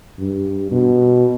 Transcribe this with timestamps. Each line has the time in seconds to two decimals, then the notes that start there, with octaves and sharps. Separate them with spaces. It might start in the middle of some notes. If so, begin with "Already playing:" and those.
0.19 G2
0.71 B2